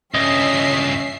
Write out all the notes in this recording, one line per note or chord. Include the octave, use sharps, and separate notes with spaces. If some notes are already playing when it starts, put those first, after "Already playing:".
C#2 G2 C#4 D#5 E5 C7